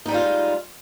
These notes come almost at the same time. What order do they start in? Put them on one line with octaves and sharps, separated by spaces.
D#4 G3 G#3 F4